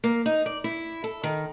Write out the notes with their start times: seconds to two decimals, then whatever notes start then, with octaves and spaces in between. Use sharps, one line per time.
0.04 A#3
0.26 D#4
0.46 D5
0.64 E4
1.04 A4
1.23 D#3